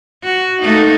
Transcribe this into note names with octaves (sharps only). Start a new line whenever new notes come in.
F#4
A3 A#3 D#4